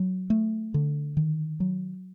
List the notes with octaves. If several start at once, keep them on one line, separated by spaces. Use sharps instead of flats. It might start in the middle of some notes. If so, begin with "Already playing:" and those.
Already playing: F#3
A3
D3
D#3
F#3